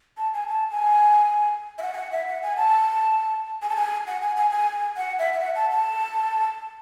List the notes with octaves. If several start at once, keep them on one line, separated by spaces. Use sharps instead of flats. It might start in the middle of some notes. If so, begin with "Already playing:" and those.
A5
G#5
A5
G#5
E5
F#5
G#5
F#5
E5
F#5
G#5
A5
G#5
A5
G#5
F#5
G#5
G#5
G#5
F#5
E5
E5
F#5
A5
A5